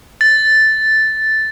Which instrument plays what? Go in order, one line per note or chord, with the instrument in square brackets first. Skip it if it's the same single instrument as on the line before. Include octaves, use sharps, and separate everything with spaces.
[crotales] A6